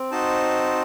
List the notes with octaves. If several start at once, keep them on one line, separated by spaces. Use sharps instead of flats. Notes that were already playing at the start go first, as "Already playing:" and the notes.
Already playing: C4
D#4 F#4 C5 D#5 A5